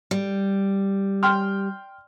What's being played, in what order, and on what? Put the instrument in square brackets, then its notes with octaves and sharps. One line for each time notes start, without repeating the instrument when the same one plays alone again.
[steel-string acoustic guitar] G3
[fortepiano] G5 C6 F6